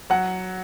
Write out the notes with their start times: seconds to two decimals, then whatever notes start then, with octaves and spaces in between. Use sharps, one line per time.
0.10 F#3 F#5